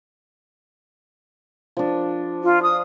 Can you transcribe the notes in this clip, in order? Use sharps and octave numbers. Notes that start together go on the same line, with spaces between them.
F3 D4
F4
D#6